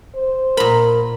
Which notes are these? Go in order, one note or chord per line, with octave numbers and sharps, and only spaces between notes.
C5
A#2 A#4 B5